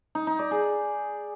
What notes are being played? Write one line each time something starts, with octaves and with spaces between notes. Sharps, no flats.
D#4
D#4
D5
G#4